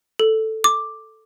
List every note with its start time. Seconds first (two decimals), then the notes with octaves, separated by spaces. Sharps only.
0.19 A4
0.64 D6